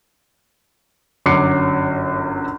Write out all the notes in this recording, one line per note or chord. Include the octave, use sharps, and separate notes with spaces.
G1 F#2 F#3 D6 C7 C#7